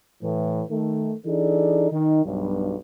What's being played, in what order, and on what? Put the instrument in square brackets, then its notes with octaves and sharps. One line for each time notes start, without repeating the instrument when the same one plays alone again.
[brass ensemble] A2 E3
D#3 A3
E3 D4 D#4 G#4 A4 D5
D#3 D#4
B1 G2